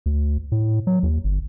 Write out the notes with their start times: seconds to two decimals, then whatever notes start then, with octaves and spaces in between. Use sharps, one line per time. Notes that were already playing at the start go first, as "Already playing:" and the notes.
0.06 D2
0.52 A2
0.87 F#3
1.03 D#2
1.24 G1